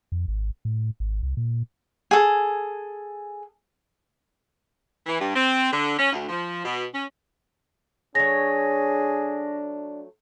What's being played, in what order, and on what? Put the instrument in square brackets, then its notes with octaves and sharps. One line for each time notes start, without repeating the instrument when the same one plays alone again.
[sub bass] F2
G#1
A2
G#1
C2
A#2
[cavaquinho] G#4 A4
[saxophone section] E3
G2
C4
D3
C#4
D2
F3
B2
C#4
[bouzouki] F#3 A3 C#5 [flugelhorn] D4 [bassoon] G#4 [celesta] A#6